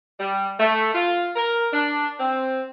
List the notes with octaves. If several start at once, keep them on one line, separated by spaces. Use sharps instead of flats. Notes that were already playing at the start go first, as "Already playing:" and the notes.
G3
A3
F4
A#4
D4
C4